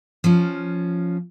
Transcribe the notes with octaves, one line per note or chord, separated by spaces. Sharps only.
F3 C#4